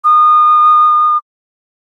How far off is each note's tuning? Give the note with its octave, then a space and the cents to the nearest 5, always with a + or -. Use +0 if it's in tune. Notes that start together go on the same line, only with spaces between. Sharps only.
D#6 -30